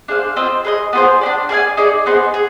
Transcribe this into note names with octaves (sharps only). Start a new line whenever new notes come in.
D4 G#4 C5 F5
C4 F4 C5 D#5
G#4 B4 D#5
B3 F4 G#4 C5
D4 G4 D5
G#4 D5 F5 G#5
D#4 G#4 D5
B3 D#4 G#4 C5
G#4